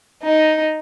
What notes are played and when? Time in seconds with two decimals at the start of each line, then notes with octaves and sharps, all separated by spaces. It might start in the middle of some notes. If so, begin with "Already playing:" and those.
0.23 D#4